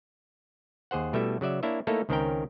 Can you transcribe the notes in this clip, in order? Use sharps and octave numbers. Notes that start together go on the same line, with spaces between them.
D#2 G#4 C5 F#5
B2 G3 A3 E4 A4 E5
C#3 F#3 D5 E5
A#3 D4 E4 C#5 E5
A3 A#3 D#4 E4 A4 C#5
C#2 D#3 C4 C#4 A#4 G5